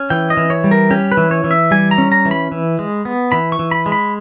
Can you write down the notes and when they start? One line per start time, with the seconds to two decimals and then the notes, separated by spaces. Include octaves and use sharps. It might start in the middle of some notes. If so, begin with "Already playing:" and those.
Already playing: C#4
0.10 E3 G5
0.30 D#5
0.37 E3
0.50 C#5
0.64 G3
0.71 A#4
0.90 C#4 G4
1.12 B4
1.17 E3
1.31 C#5
1.44 E3
1.51 E5
1.71 G3 G#5
1.91 A#5
1.98 C#4
2.12 A#5
2.25 E3
2.31 B5
2.52 E3
2.79 G#3
3.05 B3
3.32 E3 B5
3.52 C#6
3.59 E3
3.71 B5
3.86 G#3
3.92 B5